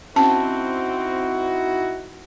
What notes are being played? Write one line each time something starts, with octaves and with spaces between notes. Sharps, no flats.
C4 C#4 D#4 E4 F#4 A5